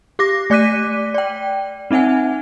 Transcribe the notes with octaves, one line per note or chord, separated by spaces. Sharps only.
G4 D6 A#6
A3 D5 D6 F#6 B6 D#7
D5 G5
C4 D#4 E5 F#5 G#5